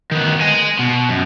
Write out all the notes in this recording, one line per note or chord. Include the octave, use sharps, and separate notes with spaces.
D#3 B3
D#5 G#5
B2
F#2